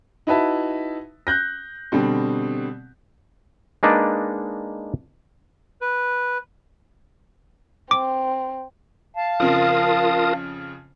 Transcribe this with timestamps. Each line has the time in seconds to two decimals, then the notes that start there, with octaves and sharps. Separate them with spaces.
0.27 D#4 E4 F#4 B4 E5 A5
1.27 F#6 G6 A#6
1.92 B2 D3 G3 C4
3.83 G#3 A#3 D4 D#4 B4 D5
5.81 B4
7.91 C4 D6
9.17 F5 A5
9.40 F2 C#3 F3 F4 A#4 D#6